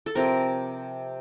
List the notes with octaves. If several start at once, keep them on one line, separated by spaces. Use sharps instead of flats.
A4
C3 F3 C4 A#4